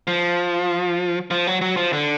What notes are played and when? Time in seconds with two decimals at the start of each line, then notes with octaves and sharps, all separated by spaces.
0.07 F3
1.31 F3
1.47 F#3
1.61 F#3
1.77 F3
1.93 D3